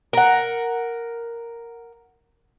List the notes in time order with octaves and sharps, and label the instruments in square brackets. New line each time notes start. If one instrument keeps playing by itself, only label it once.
[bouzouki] A#4 F#5